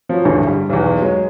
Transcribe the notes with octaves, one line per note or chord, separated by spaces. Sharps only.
F3 F#3
A1 D2 G2 F#4 G#4
G3
B1 E2
F#3 G#3